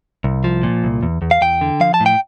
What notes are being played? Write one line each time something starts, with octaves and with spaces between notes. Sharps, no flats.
C2
F3
A#2
C2
E2
E2
F5
E2 G5
D3
F3 F5
A5
A2
G5